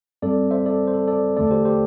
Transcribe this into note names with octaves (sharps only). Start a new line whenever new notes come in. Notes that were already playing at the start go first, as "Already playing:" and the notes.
G2 G3 C4 A4 D5
C5 E5
A4 D5
C5
A4
A4 D5
E2 D3 A3 A4 D5
G4 C5
G4 C5